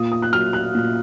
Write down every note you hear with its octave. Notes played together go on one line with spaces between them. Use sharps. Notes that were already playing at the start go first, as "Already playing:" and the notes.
Already playing: A#2 D#6
D#6
F#6
F#3 F6
F#6
A#2